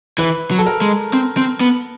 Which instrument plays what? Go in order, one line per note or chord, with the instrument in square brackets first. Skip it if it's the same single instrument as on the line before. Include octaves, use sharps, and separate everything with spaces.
[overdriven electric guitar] E3 [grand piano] B4
[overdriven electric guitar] F#3
[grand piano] A4
A#4
[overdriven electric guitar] G#3
C4
C4
B3